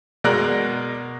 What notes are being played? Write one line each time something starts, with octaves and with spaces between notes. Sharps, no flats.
B2 G#3 A#4 D5 A#5 F#6